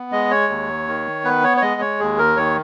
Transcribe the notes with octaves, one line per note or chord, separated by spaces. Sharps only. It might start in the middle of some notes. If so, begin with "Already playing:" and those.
Already playing: B3
G#3 D#5
C#5
D#2
D#3
B3 B4
C#5
C#5
G#3 D#5
C#5
D#2 G#4
A#4
D#3 C#5